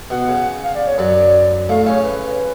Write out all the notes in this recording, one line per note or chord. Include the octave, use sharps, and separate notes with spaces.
B2 F#5
C#3
F5
D5
C#5
F#2 F#3 D5
A2 A3 F5
C#3 C#4 C#5
B4